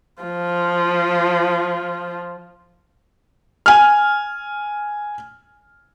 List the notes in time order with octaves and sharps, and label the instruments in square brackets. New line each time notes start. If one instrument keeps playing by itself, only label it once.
[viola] F3 F4
[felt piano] G#5 F6